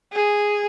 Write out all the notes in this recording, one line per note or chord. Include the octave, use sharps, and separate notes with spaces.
G#4